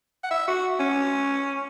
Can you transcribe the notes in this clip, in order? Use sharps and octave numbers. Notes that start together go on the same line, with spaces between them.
F#5
E5
F#4
C#4